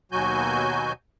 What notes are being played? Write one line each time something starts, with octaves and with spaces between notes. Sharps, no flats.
D#2 B2 F#3 F#4 G#5 G6